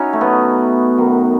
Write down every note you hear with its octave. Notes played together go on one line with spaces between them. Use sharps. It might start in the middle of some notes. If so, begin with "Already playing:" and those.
Already playing: C#4 D#4 E4 F#4
A3
B2 F#3 B3
F#2 D#3 F#3